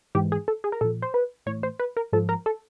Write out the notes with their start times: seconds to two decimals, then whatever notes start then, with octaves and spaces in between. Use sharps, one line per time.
0.15 G#2 E3 G4
0.32 G#4
0.48 A4
0.64 G#4
0.72 A#4
0.81 A#2 F3 A4
1.02 C5
1.14 B4
1.46 A2 E3 C#5
1.63 C5
1.80 B4
1.97 A#4
2.13 G#2 F3 A4
2.29 A#4
2.46 A4